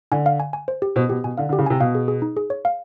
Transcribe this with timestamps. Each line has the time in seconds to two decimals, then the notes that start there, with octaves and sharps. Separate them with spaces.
0.12 D3 G#5
0.26 F5
0.40 G#5
0.53 G#5
0.68 C5
0.82 G4
0.96 B2 C5
1.09 B2 G4
1.24 B2 G#5
1.38 D3 F5
1.49 D3
1.53 G4
1.59 C#3
1.66 C3 G#5
1.80 B2 F5
1.95 G#4
2.08 G#4
2.22 D#4
2.37 G#4
2.50 C#5
2.65 F5